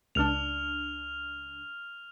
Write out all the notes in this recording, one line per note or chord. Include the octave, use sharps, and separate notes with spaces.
C#2 D4 F6 F7